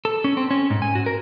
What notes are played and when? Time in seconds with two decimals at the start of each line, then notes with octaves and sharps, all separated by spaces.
0.05 A4
0.24 C#4
0.37 C4
0.51 C#4
0.70 G#2
0.82 G#5
0.95 F#4
1.06 A#4